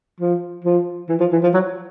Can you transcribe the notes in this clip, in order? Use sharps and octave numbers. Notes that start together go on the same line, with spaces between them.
F3
F3
E3
F3
E3
F3
F#3